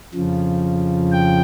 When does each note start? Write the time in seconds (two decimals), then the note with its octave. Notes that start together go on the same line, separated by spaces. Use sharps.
0.14 F2 C#3 F3
1.12 G5